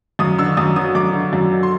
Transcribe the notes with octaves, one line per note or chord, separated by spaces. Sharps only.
F#2 D#6
D3 E6
F#2 D#6
F#3 D#6
F#2 D6
D3
F#2
F#3
C6